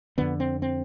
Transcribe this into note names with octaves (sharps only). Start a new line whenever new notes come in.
F2 D3 B3
C4
C4